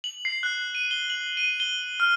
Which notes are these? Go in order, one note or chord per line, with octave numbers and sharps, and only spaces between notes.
F#7
C7
F#6
D#7
G7
F#7
D#7
G7
F6